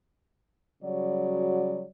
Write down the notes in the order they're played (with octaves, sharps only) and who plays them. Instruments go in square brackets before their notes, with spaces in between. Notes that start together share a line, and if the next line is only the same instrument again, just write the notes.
[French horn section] C#3 F#3 G3 F#4 C#5 D5